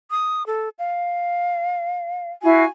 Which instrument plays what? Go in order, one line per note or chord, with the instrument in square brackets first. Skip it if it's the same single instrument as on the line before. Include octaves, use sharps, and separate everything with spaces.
[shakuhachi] D#6
A4
F5
[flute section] E4 F#4 F5 [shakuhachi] G#5